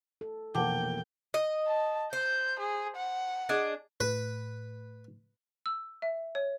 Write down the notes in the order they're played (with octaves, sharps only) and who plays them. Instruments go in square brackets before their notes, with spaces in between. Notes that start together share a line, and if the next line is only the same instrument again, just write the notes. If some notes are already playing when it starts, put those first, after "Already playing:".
[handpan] A4
[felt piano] F1 A#3 [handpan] B2 E3 [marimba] F#5 A5 D6 [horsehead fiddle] G5
[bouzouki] D#5
[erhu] A5
[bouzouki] C5 [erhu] G6
[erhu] G#4
F#5
[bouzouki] D4 G#4 D#5
[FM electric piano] A2 [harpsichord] B4
[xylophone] E6
E5
C#5